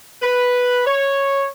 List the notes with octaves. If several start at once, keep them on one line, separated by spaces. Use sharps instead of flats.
B4
C#5